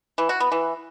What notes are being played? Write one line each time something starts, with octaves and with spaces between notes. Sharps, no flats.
E3
F#4
B3
E3